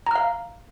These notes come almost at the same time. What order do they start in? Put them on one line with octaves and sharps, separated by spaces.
A#5 F6 F5